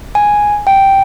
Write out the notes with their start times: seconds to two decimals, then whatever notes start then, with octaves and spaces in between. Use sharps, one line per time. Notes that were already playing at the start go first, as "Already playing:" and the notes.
0.15 G#5
0.67 G5